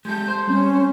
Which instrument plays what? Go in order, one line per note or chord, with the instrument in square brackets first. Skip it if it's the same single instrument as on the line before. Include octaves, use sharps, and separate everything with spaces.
[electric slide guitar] G#3 G4 A4 [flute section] G6
[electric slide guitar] C5
[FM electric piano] G3 C4 [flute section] C#4